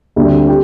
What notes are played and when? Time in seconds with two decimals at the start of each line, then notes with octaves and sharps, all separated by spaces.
0.16 D2 D3 G3 C4
0.48 G4